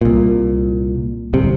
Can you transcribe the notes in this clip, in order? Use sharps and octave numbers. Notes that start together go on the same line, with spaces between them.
C2 A#2
D1 C2 C3